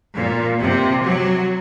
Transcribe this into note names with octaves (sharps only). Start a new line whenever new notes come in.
A#2
C3
F#3